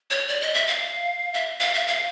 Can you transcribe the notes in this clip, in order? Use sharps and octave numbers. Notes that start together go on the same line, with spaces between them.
C#5
D5
D#5
E5
F5
E5
F5
E5
F5